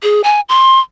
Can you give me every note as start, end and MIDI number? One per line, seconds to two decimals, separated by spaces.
0.03 0.21 68
0.24 0.40 80
0.49 0.80 84